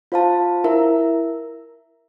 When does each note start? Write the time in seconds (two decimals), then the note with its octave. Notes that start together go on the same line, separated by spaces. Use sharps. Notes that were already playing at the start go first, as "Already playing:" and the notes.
0.12 F4 C5 F5 A5
0.64 E4 A#4 E5